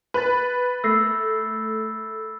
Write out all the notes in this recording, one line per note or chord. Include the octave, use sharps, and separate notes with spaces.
B4 B5 A6
A3 E6 A#6 C7